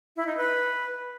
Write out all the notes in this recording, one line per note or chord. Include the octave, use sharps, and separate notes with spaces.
E4
D#4
B4